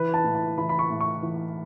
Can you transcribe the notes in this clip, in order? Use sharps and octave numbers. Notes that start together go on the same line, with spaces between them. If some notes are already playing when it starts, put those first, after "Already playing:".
Already playing: E3 B4
A5
A2
A5
E3 B5
B5
C#6
A2
C#6
E3